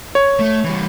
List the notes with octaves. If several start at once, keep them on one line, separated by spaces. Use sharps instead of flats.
C#5
A3
E3 G3